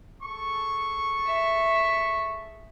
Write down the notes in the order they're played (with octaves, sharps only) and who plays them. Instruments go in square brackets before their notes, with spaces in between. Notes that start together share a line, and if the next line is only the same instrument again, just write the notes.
[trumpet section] G#4 A4 C#6
[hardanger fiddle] E5